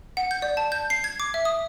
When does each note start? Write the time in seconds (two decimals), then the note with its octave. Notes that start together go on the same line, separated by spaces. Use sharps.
0.17 F#5
0.31 G6
0.42 D5
0.57 A5
0.72 G6
0.90 C7
1.04 G#6
1.20 D6
1.34 E5
1.45 D#6